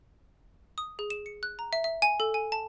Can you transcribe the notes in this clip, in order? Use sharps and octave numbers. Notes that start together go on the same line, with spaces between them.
D#6
G#4
E7
C#7
F#6
A#5
E5
E5
G#5
A4
G#5
A5